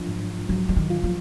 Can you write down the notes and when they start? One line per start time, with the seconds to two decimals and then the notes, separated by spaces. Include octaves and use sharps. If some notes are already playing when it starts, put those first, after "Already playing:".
Already playing: F3 F#3 D4 F4
0.08 G#2
0.49 F3 F#3
0.69 F3
0.76 D#3
0.90 F4
1.04 F3